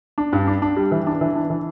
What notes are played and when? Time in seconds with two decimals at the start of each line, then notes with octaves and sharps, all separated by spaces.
0.18 D4
0.33 G2
0.47 D4
0.62 D4
0.77 G3
0.91 E3
1.07 D4
1.21 E3
1.36 D4
1.50 E3